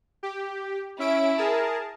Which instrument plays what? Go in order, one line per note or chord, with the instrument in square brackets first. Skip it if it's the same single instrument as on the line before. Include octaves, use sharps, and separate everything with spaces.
[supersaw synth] G4
[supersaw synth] C#4 E5 D7 [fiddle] E4
[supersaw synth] G#4 A#4 A5